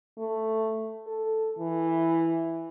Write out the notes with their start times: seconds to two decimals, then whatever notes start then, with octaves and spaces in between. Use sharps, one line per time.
0.18 A3
1.07 A4
1.59 E3